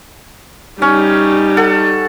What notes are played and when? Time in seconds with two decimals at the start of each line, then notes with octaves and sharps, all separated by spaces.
0.82 G3 C#4 D#4
1.57 A4 F#5